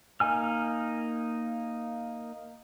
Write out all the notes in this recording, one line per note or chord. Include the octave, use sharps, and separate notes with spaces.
A#3 D#4 G#5 F6